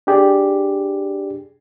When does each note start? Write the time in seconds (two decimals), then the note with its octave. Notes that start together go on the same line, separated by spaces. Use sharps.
0.07 D4 G4 G#4 D5